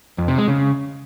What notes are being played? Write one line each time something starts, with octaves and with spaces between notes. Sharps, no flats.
F2
C3
G#3
C#3